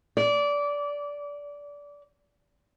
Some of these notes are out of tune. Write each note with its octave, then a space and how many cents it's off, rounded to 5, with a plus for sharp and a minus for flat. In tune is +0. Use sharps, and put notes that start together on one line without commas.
D5 -20